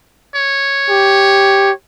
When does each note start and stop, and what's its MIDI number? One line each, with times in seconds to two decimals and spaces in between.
0.35 1.71 73
0.90 1.72 67